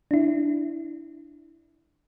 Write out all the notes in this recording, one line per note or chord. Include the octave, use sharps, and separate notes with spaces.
D4 E4